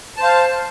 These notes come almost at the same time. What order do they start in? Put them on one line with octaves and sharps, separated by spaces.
A5 C5 F5